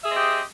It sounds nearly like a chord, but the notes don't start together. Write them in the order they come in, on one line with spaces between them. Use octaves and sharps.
E5 G#4 D#5 C4 G4